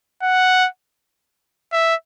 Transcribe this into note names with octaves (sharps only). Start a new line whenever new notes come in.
F#5
E5